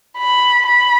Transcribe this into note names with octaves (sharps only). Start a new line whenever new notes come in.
B5
B5